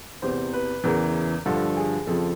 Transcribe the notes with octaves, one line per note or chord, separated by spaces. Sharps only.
E2 C3 E3 C5
B4
E2 C#3 E3 A#4
G2 D3 F3 A4
G#4
F2 C#3 F3 A4